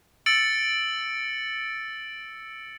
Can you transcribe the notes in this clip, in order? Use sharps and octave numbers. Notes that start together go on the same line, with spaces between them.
E6 A6 C#7 D7 F#7